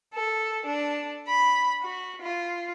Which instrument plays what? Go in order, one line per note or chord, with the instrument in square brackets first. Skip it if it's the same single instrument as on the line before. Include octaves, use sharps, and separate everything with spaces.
[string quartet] A4
D4
B5
F#4
F4